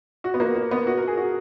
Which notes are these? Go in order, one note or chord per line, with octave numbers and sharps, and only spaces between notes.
F#4
B3
A#3
A#3
B3
F#4
A#4
G#4
F#4